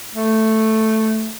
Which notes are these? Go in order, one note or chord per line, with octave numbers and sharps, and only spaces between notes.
A3